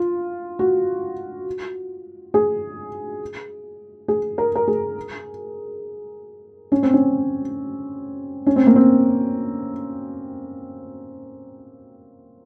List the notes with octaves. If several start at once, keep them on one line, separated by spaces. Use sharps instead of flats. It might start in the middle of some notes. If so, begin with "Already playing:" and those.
Already playing: F4
F#4
G#4
G#4
A#4
A#4
G#4
C#4
C4
C#4
C#4
C4
A#3
C4